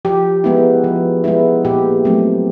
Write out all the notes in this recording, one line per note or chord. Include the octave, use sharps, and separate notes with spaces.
F3 G4
G#3 B3 E4
F3
G#3 B3 E4
A#2 G4
F#3 A3 C4